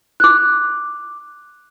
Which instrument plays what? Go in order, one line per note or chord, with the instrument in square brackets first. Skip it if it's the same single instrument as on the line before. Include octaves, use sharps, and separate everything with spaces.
[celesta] D6 F#6